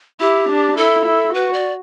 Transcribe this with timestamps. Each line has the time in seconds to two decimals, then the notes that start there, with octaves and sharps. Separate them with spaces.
0.20 E4 G4
0.49 D4
0.77 E4 A4
1.05 E4
1.34 F#4 B4
1.53 D5